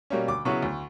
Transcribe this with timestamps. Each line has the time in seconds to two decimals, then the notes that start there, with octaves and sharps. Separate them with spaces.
0.10 B2 G3 A#3 C#4
0.28 D2 D6
0.45 C#3 F#3 B3 E4 C#6
0.63 D2